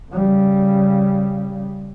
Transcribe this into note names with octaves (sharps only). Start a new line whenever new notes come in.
C#3 G3